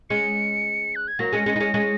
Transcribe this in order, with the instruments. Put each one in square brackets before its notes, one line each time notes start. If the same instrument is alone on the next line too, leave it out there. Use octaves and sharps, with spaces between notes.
[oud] G#3 C#4 [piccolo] C#7
[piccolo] F#6
G#6
[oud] F#3 A#3 [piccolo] A#6
[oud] G#3 C#4
G#3 C#4
D#4
G#3 C#4
G#3 C#4